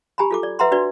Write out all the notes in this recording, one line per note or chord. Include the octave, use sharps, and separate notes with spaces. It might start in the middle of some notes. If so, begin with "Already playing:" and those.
G4 G#5 A#5 B5
F4 A4 D6
D5
B4 E5 F#5 A#5 C6
D4 F#4 B4 D5